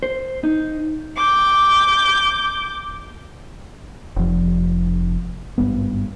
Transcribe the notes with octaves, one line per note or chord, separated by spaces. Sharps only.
C5
D#4
D6 G6
F1 F3
G#1 G2 B3